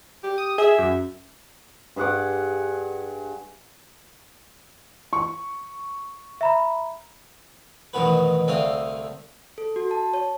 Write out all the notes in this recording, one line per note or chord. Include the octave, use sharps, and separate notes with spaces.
G4
D#6
G#4 E5
F#2
G2 G#4 F#5 D6
C#6
E5 A#5 B5
A1 F2 B2 D#3 F#4 B4
C2 D3 A3 C4 F5 D#6
A4
F#4
A5
C#5